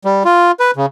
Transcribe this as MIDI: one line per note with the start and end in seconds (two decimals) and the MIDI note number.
0.05 0.23 55
0.25 0.51 65
0.60 0.71 71
0.76 0.86 49